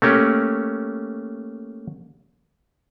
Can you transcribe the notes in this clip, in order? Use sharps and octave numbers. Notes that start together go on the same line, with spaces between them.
A3 A#3 C#4 G4